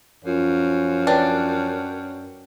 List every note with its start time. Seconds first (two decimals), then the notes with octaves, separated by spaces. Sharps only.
0.24 F#2 F3 C#4 F4
1.07 D4 B4 C#5 G5